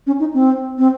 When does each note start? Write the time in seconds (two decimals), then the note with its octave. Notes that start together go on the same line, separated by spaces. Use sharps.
0.07 C#4
0.20 D#4
0.34 C4
0.78 C4